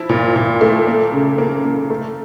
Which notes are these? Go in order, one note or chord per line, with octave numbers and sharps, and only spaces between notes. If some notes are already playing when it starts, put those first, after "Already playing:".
Already playing: F3 E4
A#2
A#2
A3
A#3
C#3
A#3
A#3
A3